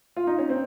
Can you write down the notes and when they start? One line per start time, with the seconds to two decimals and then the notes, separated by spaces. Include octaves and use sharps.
0.16 F4
0.27 D#4
0.39 C#4
0.49 C4